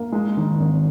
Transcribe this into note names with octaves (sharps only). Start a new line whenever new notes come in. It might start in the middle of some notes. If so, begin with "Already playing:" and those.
Already playing: A#3
G#3
D#3
G#1